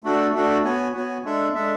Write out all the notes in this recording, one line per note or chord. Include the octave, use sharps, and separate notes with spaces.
A3 D4 F#4 A4
A3 D4 F#4 A4
B3 F#4 C#5 G#5
B3 F#4 C#5 G#5
G#3 D4 A4 E5
G#3 D4 A4 E5